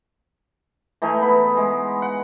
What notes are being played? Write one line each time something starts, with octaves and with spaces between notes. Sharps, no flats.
E3 A3 D#4 G#4
B3 B5
G#3
F#5